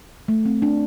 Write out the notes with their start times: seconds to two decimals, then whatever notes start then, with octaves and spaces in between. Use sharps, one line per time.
0.28 A3
0.45 C4
0.62 D4